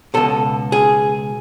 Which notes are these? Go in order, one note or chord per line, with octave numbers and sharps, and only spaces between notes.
C#2 B2 A4
G#4